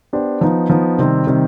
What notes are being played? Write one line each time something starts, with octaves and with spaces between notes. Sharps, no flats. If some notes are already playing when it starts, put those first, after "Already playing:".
B3 D4 G4 C5
F3 B3 D#4
F3 B3 D#4
C3 D#3 G3 C4
C3 D#3 G3 C4